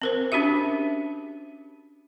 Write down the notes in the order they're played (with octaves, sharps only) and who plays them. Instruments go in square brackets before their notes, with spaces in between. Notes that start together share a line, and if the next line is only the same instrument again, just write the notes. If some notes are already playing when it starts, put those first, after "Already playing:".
[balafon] C4 A#4 C5
C#4 D4 F#4 G4 E5